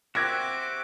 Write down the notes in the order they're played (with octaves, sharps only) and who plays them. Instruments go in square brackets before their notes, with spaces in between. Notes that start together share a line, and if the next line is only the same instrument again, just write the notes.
[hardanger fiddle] C4 D6 [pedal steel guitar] F#4 G4 E5 [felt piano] F#6 G#6 A#6